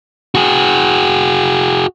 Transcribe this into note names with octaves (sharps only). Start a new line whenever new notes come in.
F#4 G#4